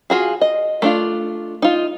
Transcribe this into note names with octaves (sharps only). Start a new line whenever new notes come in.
F4 F#4 G#4
D#5
A3 D4 F4
D#4 F4